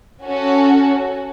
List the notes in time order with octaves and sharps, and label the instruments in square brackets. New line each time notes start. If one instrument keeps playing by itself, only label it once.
[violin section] C#4 F#4 A4